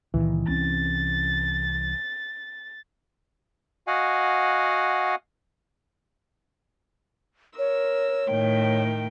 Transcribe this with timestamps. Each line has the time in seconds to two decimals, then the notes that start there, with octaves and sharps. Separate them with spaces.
0.14 C#2 A#2 D#3 E3
0.48 C2 C4 C#4 A6
3.87 F#4 D#5 F5 F#5 G#5
7.59 A#4 C#5 E6
8.30 A2 D#3 G5